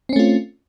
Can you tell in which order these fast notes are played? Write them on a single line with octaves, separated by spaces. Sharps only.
C4 C#4 A3 F4